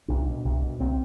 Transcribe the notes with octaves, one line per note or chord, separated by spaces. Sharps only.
C2 D4
B2
C2
B2
C2 C4